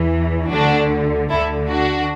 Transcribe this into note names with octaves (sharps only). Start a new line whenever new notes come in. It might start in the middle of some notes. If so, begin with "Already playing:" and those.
Already playing: E2 E3
D2 D3 D4 F#4
D2 D3 E4 A4
D4 F#4